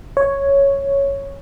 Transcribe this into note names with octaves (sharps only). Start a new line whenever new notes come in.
C#5